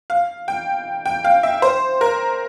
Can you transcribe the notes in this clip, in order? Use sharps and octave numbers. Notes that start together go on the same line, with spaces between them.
F5
G5
G5
F5
E5
C5
A#4